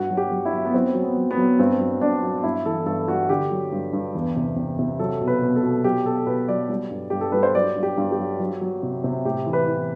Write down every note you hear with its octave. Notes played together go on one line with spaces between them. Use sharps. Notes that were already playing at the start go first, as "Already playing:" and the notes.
Already playing: G2 F#4
F#3
G4
F#3
E4
F#3
B3
F#3 C4
F#3
B3
F#3
B3
F#3
G2 C4
F#3
G2 D4
F#3
G2 E4
E3 A4
G2 A4
G3 F#4
D3 G4
F#3
G2
G2
E2
C3
C3
C3
F#3 A4
B2
B4
B2
A4
B2
F#3 G4
B2 A4
B2 B4
F#3 D5
G3
G2
G2 G4
A4
G3 B4
C5
F#3 D5
G2
G4
G2
G4
F#3
F#3
F#3
C3
C3
A2 G4
E3
B4
E3